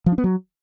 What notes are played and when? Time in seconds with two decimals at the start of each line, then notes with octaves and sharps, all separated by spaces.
0.06 F3
0.12 D4
0.18 B3
0.24 F#3